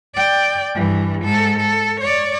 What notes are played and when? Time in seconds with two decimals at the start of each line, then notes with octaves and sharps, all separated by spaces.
0.14 D5 G5
0.75 G2 E3
1.24 G#2 A4
1.59 A4
2.00 C#5 D5